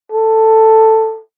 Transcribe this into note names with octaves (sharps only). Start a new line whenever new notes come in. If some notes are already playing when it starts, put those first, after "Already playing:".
A4